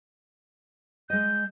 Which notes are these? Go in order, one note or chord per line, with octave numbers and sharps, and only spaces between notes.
G#3 D#5 G6